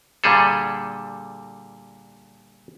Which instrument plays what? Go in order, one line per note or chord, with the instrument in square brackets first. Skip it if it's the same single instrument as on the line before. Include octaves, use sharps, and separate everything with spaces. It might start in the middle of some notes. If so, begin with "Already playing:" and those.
[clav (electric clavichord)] A#2 D3 G3 G#4 A4